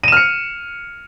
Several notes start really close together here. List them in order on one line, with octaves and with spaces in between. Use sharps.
D#7 E7 F6 C#7